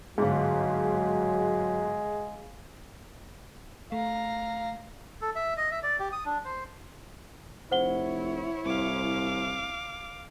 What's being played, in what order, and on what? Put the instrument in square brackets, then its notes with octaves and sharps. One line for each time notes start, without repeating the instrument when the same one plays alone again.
[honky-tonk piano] G1 G#2 [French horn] F#3 [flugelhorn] G#3 [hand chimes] G#4 F5
[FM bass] A3 [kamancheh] F5 A#5
[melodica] A4
E5
D#5
E5
D5
G4
D#6
D4
C5
[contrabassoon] F1 [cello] E4 C#5 [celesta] C5 F#5 G7
[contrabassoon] C2 [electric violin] F5 D6